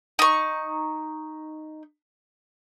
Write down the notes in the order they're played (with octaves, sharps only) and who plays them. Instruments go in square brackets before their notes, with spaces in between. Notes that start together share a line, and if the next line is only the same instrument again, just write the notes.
[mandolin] D#4 C#6